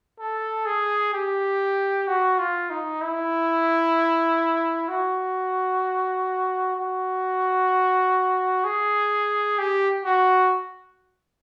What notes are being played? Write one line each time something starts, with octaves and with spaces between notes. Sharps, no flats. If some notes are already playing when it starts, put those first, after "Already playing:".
A4
G#4
G4
F#4
F4
D#4
E4
F#4
F#4
G#4
G4
F#4